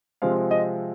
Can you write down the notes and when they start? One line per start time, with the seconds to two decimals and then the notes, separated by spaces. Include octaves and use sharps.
0.22 C3 F3 G#3 C4 F5
0.51 D#5